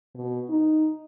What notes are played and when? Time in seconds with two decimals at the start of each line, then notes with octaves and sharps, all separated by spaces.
0.15 B2
0.50 D#4